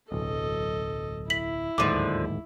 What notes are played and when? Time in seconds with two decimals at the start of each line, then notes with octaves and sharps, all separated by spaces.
0.12 D1 B1 A4 D#5
1.30 E4 B6 F#7
1.78 D1 D#2 G#2 D3 F3 D6